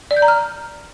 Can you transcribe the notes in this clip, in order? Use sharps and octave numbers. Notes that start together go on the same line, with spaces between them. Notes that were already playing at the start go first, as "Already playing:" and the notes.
D5
G6
A#5
F6